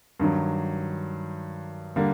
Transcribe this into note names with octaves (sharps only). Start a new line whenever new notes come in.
G2 D#3 F#3
D3 G3 A#3